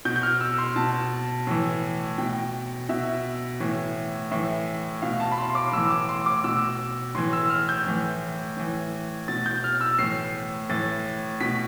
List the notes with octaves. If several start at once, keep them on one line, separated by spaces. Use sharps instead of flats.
B2 G6
G6
F6
E6
C6
B2 A5
A2 E3
B2 G5
B2 E5
A2 E3
A2 E3 E5
B2 F5
A5
B5
C6
C6
D6
A2 E3 E6
D6
C6
D6
B2 E6
A2 E3 C6
E6
F6
G6
A2 E3
A2 E3
B2 A6
G6
F6
E6
A2 E3 C7
A2 E3 A6
B2 B6